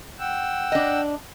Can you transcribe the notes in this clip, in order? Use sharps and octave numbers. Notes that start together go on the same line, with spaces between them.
F#5 G5 E6
D4 D#5